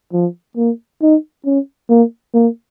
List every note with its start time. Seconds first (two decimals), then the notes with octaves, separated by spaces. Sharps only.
0.13 F3
0.57 A#3
1.02 D#4
1.45 C#4
1.89 A#3
2.34 A#3